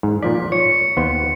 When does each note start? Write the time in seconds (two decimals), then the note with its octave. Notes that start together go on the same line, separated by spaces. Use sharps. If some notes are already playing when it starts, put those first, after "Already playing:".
0.03 G#2
0.23 A#2 F3 D5 B6
0.52 C#5 C#7
0.97 D#2 B3 C5